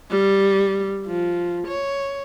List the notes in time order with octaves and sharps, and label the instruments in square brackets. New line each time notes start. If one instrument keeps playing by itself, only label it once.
[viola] G3
F3
C#5